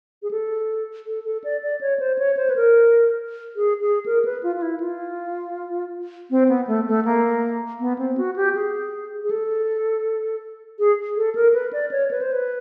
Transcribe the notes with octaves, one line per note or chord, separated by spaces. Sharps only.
G#4
A4
A4
A4
D5
D5
C#5
C5
C#5
C5
B4
A#4
G#4
G#4
A#4
B4
F4
F4
E4
F4
C4
B3
A3
A3
A#3
B3
C4
F#4
G4
G#4
G#4
A4
G#4
A4
A#4
B4
D5
C#5
B4
C5
B4